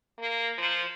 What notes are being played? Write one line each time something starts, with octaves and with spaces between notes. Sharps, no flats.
A#3
F3